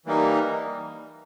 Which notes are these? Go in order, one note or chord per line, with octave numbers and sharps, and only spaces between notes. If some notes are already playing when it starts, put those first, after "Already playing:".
E3 G3 A#3 D#4